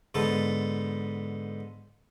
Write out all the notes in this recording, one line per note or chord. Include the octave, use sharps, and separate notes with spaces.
G#2 D3 B3 A4